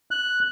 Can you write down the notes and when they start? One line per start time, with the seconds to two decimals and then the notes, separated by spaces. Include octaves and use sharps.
0.11 F#6